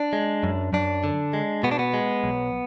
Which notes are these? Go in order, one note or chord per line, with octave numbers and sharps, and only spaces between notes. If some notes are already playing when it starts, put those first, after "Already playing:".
Already playing: D4
G#3
F#2
F#2 D4
D3
G#3
B2 B3
D4
B3
G#3
B1